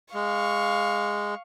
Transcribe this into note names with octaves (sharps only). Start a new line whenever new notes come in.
G#3 F5 C#6